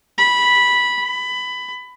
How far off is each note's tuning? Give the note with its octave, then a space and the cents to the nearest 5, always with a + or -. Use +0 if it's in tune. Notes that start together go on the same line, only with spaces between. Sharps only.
B5 -10
B5 +15